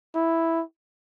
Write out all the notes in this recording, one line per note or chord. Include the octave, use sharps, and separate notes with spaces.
E4